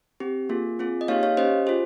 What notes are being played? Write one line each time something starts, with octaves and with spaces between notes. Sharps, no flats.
C4 G4
A#3 F4 G#4
C4 F4 G#4
D#5
A#3 D#4 G4 C#5 F5
C#5 F5
C#4 G4 C5 D#5
F4 G#4 C5